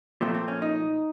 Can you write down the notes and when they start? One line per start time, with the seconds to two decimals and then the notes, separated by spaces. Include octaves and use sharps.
0.21 A#2 F3 A3 C4 F4
0.34 C4
0.48 C#4
0.62 D#4